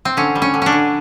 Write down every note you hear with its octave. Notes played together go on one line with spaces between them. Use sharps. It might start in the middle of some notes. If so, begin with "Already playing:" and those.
C4
D3 C#4
G3
C#4
D3
C#4 D4
D3